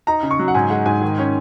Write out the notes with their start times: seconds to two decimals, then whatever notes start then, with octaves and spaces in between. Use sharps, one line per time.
0.07 D#4 A#5
0.23 C#3
0.31 C#6
0.39 F#3
0.48 F#5
0.55 G#2 G#5
0.70 G#3 F#5
0.86 G#2 G#5
1.02 D#3
1.19 C#4